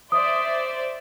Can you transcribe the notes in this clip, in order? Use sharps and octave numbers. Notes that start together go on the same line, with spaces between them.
C5 D5 E5 D#6